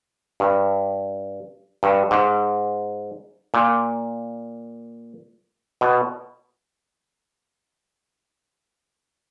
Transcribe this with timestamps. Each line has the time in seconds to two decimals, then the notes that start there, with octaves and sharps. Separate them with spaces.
0.40 G2
1.83 G2
2.11 G#2
3.54 A#2
5.81 B2